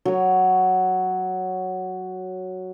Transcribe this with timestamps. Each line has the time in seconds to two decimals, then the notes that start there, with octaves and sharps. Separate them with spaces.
0.05 F#3 C#5